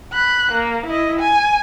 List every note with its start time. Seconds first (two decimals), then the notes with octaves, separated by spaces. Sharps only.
0.13 B5 F#6
0.52 A#3
0.86 E4 D#5
1.19 G#5